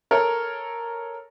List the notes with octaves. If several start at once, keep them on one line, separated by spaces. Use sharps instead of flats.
A4 A#4 C#5